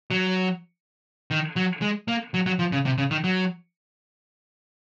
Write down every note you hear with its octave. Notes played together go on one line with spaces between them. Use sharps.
F#3
D#3
F#3
G#3
A#3
F#3
F#3
F3
C#3
C3
C#3
D#3
F#3